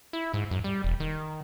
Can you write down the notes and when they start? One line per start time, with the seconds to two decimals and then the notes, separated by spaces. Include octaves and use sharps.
0.13 E4
0.34 G#2
0.51 F#2
0.64 G3
0.84 E1
1.00 D#3